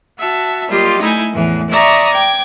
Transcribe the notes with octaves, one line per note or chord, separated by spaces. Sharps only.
F#4 E5 A5
F#3 G3 A#3 F4 G4 D#5
A3 D#4 E4 G#5 G6
E2 A2 E3
D5 E5 A#5 C#6 D#6
G5 D6 G#6